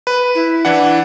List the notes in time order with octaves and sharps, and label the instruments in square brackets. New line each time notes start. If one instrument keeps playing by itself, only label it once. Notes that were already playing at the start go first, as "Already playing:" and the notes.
[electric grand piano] B4
[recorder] E4
[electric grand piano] E3 D4 F#5